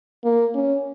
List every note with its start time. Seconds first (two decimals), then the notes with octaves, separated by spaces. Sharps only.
0.24 A#3
0.55 C#4